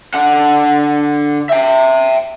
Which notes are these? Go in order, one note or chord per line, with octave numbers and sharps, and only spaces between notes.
D3 F#5
E5 G5